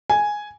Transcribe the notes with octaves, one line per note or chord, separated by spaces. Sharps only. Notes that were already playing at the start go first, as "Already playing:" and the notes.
G#5